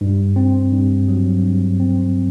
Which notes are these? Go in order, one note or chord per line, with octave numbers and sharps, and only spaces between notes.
G2
C4
G2
F#3
G2
C4